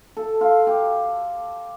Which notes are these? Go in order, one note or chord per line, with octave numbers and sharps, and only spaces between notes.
A4
F4
G4